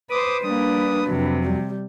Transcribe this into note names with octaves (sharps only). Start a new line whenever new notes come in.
B4 C5 D6 D#6
G3 A#3 D4 B4 D#6
F2 C3 F#3
G3